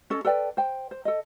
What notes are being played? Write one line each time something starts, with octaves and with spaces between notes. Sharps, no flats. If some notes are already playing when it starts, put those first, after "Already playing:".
C#4 A4 D#5
A4 B4 D5 G5
C5 G5
C5
A4 D#5